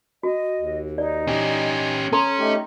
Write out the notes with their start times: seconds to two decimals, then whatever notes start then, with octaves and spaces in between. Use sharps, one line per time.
0.23 F#4 D#5
0.58 D#2
0.98 D#4 D5
1.27 C#4 G4 G#5
2.13 C#4 A4 A#5 C6
2.39 A3 D#4 G4 D#5